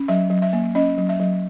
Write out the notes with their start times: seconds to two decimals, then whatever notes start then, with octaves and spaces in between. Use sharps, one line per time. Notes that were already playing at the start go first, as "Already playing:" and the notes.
Already playing: C#4
0.08 F#3 E5
0.30 F#3
0.42 E5
0.53 A#3
0.75 C#4 D#5
0.98 F#3
1.09 E5
1.20 F#3